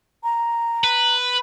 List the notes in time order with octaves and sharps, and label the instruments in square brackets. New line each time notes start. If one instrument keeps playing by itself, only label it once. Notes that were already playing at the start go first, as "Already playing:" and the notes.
[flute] A#5
[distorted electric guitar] B4